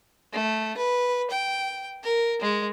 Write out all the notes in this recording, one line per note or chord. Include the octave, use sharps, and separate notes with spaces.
A3
B4
G5
A#4
G#3